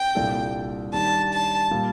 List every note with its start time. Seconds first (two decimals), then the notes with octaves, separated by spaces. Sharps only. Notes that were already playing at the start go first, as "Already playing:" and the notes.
Already playing: G5
0.15 C2 A#2 G3 D4 A4
0.93 D#3 G3 D4 G4 A5
1.32 A5
1.71 A#2 G3